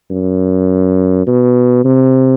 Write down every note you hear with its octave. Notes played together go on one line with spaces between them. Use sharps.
F#2
B2
C3